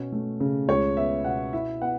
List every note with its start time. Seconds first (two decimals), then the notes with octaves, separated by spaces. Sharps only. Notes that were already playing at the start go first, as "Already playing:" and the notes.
Already playing: B2 C#4
0.12 A3
0.40 C#3
0.68 C#2 C#5
0.97 B3 E5
1.24 B2 F#5
1.53 E4 E5
1.81 B3 F#5